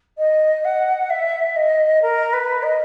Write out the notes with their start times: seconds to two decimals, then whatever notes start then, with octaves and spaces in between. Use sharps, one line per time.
0.18 D#5
0.64 F#5
1.10 E5
1.56 D#5
2.02 A#4
2.33 B4
2.63 D#5